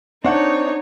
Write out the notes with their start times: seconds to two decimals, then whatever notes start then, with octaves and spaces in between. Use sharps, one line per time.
0.24 C4 D4 D#4 C#5 F#5 C#6 G6